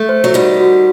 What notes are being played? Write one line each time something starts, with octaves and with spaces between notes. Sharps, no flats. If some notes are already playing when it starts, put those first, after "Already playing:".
Already playing: A3
C5
F#3
D#3 G3 F#4
F#4